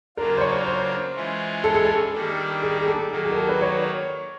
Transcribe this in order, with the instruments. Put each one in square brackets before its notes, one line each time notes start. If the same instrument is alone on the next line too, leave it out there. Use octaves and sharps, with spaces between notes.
[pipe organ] C#3 F#3 A#3 D4 F4 [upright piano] A#4
[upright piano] C5
C#5
C5
[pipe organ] E3 G#3 C#4 F4
[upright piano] A4
G#4
A4
[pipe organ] D#3 G3 A#3 D4
[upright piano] G#4
G#4
A4
[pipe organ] D#3 F#3 A#3 [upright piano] G#4
[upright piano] G#4
A#4
A4
B4
C#5